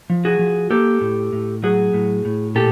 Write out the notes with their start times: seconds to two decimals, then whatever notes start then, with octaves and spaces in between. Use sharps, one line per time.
0.10 F3
0.25 F#4 G#4
0.39 F3
0.71 A#3 G4 A4
1.01 A2
1.33 A2
1.63 F#3 F#4 G#4
1.93 A2
2.25 A2
2.55 A#2 G4 A4